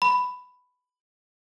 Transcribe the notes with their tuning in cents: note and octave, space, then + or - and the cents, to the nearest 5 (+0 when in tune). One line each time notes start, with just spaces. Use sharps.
B5 +10